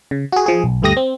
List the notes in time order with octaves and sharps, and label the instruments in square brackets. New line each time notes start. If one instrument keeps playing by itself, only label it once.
[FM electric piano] C#3
F#4 G#4
F3 G#4
B1
D2 G2 A3 G4 D#6 A#6
C4